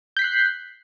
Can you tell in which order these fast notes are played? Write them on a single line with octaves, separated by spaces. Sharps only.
G6 B6 C7 F#6